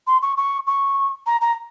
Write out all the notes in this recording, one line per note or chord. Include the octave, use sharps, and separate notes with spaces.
C6
C#6
C#6
C#6
A#5
A#5